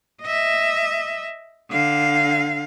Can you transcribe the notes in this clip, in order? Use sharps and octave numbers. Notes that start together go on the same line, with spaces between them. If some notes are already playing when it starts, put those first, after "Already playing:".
D#5 E5
D3 F5